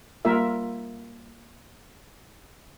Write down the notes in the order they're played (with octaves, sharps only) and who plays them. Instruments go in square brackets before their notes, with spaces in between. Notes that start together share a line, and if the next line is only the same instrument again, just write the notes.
[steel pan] G3 A#3 F4 A#4 E5